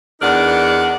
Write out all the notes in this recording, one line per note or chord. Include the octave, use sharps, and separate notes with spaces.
E2 D4 D#4 A#4 D5 F#5